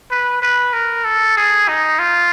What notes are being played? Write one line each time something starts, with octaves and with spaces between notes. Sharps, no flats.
B4
B4
A#4
A4
G#4
D#4
F4